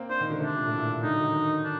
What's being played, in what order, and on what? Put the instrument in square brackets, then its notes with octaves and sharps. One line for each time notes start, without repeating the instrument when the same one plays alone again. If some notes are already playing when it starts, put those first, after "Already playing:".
Already playing: [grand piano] A#3 C4
[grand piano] D4 [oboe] C5
[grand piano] D#3
D3
[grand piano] C3 [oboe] D4
[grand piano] A#2
A2
A#2
[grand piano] D3 [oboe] D#4
[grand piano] F#3
D#3
[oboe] D4